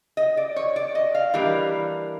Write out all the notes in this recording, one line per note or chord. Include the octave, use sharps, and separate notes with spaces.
D#5
D5
C#5
D5
D#5
F5
E3 G3 A#3 D4